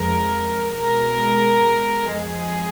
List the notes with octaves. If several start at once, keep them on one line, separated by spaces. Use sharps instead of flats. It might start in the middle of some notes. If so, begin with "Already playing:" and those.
Already playing: F2 F3 G#3 A#4
B2 G#3 A#4
F2 F3 G#3 G#4